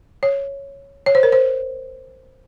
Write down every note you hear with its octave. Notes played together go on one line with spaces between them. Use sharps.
C#5
C#5
C5
A#4
C5